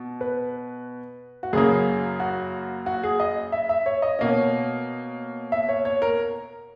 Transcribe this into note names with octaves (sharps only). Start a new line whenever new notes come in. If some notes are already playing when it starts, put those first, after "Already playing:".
Already playing: B2
B4
F#4
F#2 C#3 F#3 A#3 G#4
F#4
F#4
G#4
D#5
E5
E5
C#5
D#5
B2 A#3 C#4
E5
C#5
C#5
A#4